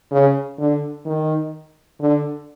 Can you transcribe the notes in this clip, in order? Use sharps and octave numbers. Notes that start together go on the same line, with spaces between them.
C#3
D3
D#3
D3